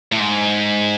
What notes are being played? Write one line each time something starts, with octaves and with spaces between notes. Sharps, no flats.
A2
G#2